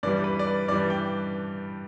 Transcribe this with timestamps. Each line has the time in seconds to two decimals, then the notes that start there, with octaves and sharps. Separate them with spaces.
0.03 G2 E3 G3 D5
0.24 B4
0.39 D5
0.47 B4
0.68 G2 E3 G3 D5
0.90 G5